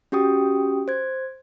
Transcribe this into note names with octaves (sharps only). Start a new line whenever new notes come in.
C#4 F#4 G4 G5 D#6
C5 G#6